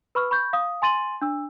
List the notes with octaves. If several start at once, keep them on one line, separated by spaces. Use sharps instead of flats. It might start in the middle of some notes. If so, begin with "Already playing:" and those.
B4 B5 C#6 F6
B5 C#6 G6
F5 D#6
G#5 C6 A6 D#7 F#7
D4 E6